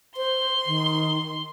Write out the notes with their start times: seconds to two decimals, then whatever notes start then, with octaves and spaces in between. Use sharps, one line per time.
0.17 C5 C6
0.66 D#3